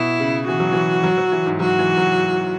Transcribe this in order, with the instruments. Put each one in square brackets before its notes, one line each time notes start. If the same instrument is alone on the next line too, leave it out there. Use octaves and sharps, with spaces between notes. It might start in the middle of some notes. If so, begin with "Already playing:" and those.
Already playing: [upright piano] B2 [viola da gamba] E4
[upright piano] C#3
[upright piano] E3 [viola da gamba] F#4
[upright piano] F#3
E3
F#3
F#3
E3
G#2
[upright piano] F#3 [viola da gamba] F#4
[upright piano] E3
F#3